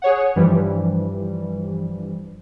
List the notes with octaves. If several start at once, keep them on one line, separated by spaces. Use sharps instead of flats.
G#4 C#5 F#5
G2 E3 F3 G3